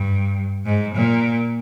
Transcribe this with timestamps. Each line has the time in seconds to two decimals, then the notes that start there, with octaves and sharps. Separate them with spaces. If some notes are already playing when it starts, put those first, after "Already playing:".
Already playing: G2
0.65 G#2
0.94 A#2